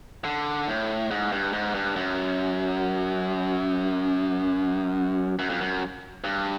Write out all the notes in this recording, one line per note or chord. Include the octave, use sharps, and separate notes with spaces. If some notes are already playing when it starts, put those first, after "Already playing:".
D3
A2
G#2
G2
G#2
G2
F#2
F#2
F2
F#2
G2